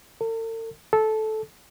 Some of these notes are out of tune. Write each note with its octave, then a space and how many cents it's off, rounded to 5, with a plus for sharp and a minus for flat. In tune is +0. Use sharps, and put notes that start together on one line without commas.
A4 +45
A4 -15